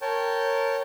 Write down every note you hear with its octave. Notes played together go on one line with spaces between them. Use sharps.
A#4 C#5 G5 A5